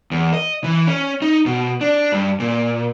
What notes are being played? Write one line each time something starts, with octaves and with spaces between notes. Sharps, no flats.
E2
D#5
E3
C#4
D#4
B2
D4
G2
A#2